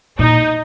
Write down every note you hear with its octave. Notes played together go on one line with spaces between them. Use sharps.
A#2 D#4